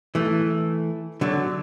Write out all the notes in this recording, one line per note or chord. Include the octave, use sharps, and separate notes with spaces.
E3 A3
D3 F#3